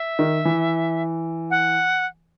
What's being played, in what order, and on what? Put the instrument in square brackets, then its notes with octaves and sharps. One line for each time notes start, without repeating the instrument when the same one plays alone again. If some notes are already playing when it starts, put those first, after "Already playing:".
Already playing: [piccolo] E5
[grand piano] D#3
E3
[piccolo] F#5